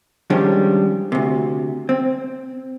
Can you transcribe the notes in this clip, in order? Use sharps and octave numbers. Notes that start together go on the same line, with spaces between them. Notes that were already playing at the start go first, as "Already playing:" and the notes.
D#3 F3 G3 G#3 C#4 D4
D2 C3
C4